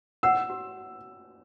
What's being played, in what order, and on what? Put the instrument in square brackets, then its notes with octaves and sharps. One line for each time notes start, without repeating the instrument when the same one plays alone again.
[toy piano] F#5 [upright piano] E6
[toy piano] F#4